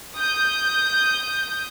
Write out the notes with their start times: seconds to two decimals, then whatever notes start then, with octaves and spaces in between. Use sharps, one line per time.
0.16 D#6 G6